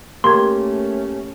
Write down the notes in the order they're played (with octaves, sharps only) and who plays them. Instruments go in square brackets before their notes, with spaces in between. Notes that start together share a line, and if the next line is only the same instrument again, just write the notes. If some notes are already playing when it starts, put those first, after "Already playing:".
[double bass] A3 C#4 [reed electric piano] A#3 G4 A#4 [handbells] C6 G#6